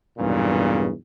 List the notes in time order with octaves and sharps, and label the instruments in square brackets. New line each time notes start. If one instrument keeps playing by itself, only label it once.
[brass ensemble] B1 E2 G2 A#2 C#3